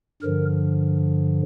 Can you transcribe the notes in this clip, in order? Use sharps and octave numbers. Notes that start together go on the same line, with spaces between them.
G2 D3 F3 A#4